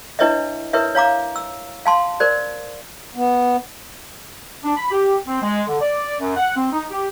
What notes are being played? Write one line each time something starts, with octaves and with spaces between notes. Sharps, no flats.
D4 E4 B4 C#5 D#5 E5
E4 A#4 B4 C#5 E5
C#5 F5 A#5 D6
E6
F5 A5 C6
A#4 C5 D5
B3
D4
B5
G4
C4
G#3
D3
D5
F#2
F#5
C4
D#4
G4